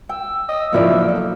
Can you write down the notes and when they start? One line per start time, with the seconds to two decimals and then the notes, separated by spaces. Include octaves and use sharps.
0.09 G5 E6
0.49 D#5 E6
0.73 F3 F#3 A#3 D#4 E4 D5
1.09 A4